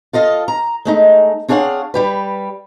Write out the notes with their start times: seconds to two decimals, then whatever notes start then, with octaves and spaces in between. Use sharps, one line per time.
0.13 F4 A4 D#5 F5
0.48 A#5
0.85 G#3 A3 D#4
1.48 C4 D4 G#4 C#5 F5 F#5
1.94 G3 G4 B4